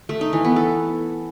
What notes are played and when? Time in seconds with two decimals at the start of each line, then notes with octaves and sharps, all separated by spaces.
0.09 A3
0.21 D#4
0.33 E3
0.45 B3
0.56 A4